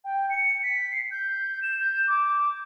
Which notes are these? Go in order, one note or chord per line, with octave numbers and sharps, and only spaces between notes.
G5
C#7
B6
C7
G6
E7
G6
D6